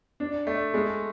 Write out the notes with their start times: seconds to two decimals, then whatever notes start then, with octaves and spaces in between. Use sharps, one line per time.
0.20 D4
0.47 A3
0.74 G#3